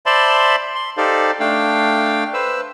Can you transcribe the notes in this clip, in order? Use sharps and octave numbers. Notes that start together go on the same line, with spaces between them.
C5 D5 E5 A5 B5 C6
C6
D#4 G4 A4 C5 D5 F5
A3 D4 F5 G5
B4 C5 E6